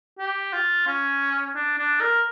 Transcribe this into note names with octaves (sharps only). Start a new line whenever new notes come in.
G4
F4
C#4
D4
D4
A#4